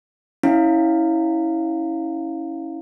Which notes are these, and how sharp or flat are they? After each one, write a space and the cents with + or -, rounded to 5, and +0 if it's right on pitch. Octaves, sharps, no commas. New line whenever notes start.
C#4 +0 E4 -20 F5 +0